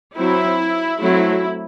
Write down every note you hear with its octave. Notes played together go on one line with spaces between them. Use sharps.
F#3 C4 E4
F#3 A3 C4 E4